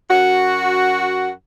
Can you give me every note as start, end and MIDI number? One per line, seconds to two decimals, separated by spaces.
0.10 1.31 42
0.10 1.31 66